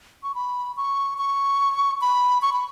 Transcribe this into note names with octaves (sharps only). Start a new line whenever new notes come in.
C#6
B5
C#6
C#6
B5
C#6
B5